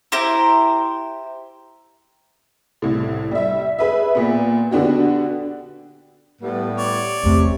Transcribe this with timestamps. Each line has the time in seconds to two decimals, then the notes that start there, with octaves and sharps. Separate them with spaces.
0.12 E4 G4 C5 A#5
2.82 C2 A2
3.31 G3 E5
3.79 G#4 B4 E5
4.15 A#2 B3
4.71 D3 B3 D4 F#4 G4
6.42 A2 G3 B3
6.77 C#5 D5
7.23 E2 C3 A3